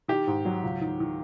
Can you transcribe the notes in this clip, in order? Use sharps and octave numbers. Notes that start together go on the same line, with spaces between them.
D#3 G4
G#2
F#3
C#2
D#3
D#3